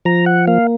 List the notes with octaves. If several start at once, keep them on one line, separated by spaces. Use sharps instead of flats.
F3 A#5
F#5
A#3 F5